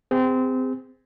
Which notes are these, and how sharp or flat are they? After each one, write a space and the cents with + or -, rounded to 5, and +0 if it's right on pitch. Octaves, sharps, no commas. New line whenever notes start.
C4 -25 G#4 -35